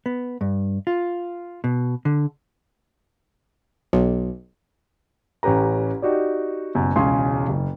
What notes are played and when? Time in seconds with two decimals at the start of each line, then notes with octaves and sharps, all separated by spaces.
0.06 B3
0.41 G2
0.87 F4
1.64 B2
2.05 D3
3.93 B1
5.43 A1 C#4 G4 B4 A#5
6.02 D#4 F#4 G4 D5
6.75 F#1 F#2 B2
6.96 E1 C#2 C#3 G#5 C6
7.48 F#1